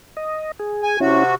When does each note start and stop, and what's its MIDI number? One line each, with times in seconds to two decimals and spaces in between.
0.17 0.52 75
0.59 0.97 68
0.83 0.99 80
1.00 1.35 48
1.00 1.24 61
1.00 1.24 64
1.00 1.35 66